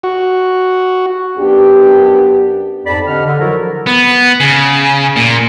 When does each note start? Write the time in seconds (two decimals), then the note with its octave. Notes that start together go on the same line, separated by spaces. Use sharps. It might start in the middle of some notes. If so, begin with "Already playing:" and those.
0.03 F#4
1.38 F#2 B3 D4 G4
2.86 F2 G#2 D5 A5 B5
3.07 D3 D4 G4 D#5 F#5 F6
3.25 D3
3.39 F3 F#3 E4 F#4 A4 A#4
3.86 B3
4.40 C#3
5.16 A#2